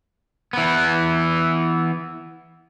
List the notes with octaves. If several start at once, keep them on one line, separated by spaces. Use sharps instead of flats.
E3 B3